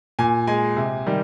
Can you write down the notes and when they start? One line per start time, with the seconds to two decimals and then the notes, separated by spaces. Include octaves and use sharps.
0.19 A#2 G#5
0.47 G#3 G#5
0.77 C3
1.06 D#3 G3